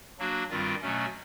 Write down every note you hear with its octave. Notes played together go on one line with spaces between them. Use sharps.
F#3 A#3 D4 F#4
G2 D#3 G3 C4 F4
B2 F#3 A3 C#4